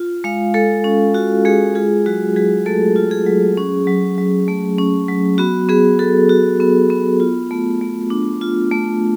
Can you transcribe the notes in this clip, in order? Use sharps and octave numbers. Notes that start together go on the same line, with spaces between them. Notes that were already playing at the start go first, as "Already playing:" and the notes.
Already playing: F4
G#3 F5
G#3 A4
C#4
F4 F#4
G#3 G#4
F4 G#4
F#3 F#4
F#3 G#4
A3 A4
F4
G#4
F#3
C#4
F#3
F#3
A3
C#4
F#3
B3 F#4
B3 G#4
F#4 A4
F#4
B3
B3
F4
A3
A3
D4
F4
A3